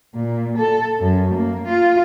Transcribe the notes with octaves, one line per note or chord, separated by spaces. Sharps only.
A#2
A4
F#2
A#3
F4